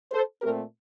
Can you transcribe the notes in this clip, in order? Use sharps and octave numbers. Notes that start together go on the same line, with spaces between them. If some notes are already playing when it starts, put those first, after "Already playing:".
A4 C5
A#2 A3 C4 G4 A#4